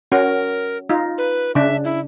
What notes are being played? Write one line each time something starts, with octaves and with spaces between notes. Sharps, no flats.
C#4 F#4 A#4
D#4 F4
B4
C#3 D4 E5
E4